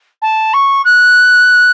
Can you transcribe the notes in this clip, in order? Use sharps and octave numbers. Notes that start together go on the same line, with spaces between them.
A5
C#6
F#6